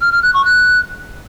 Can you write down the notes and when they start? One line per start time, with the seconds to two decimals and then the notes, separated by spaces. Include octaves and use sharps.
0.01 F6
0.12 F6
0.23 F#6
0.34 C#6
0.45 F#6